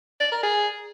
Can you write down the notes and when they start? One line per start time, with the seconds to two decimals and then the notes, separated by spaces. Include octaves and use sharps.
0.20 D5
0.32 A#4
0.43 G#4